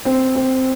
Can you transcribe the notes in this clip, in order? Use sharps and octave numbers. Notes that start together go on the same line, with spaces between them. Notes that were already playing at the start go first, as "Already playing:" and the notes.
C4
C4